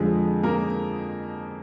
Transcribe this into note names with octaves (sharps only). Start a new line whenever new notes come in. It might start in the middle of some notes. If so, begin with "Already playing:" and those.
Already playing: F2 D3 F3 G#3 G#4
A#3 A#4